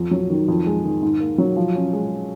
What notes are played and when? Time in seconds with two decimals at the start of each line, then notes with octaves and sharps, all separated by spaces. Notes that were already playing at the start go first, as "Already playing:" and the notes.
Already playing: F2
0.11 F#3
0.30 D#3
0.48 F2
0.66 G#3
0.85 D#3
1.02 G#2
1.20 A#3
1.38 F#3
1.56 F3
1.75 C#4
1.93 G#3